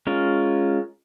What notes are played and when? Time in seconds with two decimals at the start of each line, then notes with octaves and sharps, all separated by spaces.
0.07 G#3 C#4 F4 A#4